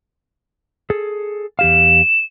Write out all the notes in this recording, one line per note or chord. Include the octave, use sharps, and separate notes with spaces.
G#4 A4
E2 G4 F5 E7